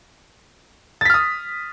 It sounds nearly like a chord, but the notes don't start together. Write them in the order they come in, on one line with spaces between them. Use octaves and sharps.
A6 B6 F6 D#6